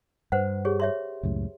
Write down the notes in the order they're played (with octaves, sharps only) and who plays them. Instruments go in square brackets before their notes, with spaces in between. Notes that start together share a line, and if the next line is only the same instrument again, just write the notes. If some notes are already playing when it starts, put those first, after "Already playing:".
[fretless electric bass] G2 [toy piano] B4 C5 F#5
[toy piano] G4 G#4 C#5
C#5 E5 C6
[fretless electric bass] C#2 F#2 A2